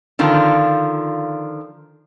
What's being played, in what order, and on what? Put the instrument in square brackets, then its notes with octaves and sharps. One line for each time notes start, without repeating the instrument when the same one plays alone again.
[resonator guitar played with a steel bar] D3 D#3 F3 F4